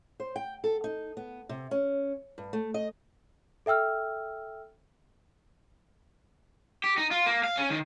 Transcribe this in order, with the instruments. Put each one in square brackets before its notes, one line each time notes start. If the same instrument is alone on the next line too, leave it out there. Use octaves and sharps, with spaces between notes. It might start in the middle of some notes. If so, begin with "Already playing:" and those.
[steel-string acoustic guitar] C5
G5
A4
D#4
B3
C3
C#4
G2
A3
D#5
[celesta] A4 E5 G5 E6 F6
[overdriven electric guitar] G4
D#4
F4
A#3
F5
C#4
D#3